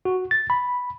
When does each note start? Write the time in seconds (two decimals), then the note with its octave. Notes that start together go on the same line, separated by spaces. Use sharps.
0.05 F#4
0.31 A6
0.50 B5